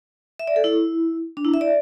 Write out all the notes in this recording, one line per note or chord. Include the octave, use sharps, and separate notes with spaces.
E5
D5
A4
E4
D4
E4
E5
D5